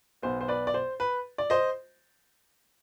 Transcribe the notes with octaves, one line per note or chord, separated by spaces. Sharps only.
B1 B2 B3 C5
C5
B4 D5
D5
C5
B4
D5
C5 D#5